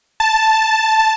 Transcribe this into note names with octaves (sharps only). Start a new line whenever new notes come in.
A5